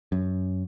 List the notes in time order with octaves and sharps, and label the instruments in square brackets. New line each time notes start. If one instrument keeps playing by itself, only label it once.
[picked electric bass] F#2